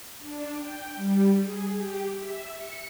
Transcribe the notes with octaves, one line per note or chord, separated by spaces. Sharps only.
D4
G5
G3
G#4
G4
E5
C#7